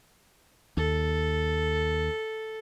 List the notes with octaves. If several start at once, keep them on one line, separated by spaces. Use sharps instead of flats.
D#2 A4